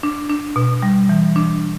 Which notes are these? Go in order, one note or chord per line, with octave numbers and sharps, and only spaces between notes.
D4
D4
B2
G3
E3
D4